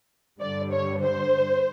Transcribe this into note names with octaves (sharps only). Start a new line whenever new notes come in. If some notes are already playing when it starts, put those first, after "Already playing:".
G2 D3 G3 D5
C#5
C5